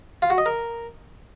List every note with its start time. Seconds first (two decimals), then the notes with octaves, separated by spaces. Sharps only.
0.22 F4
0.30 F#4
0.38 D#5
0.46 A#4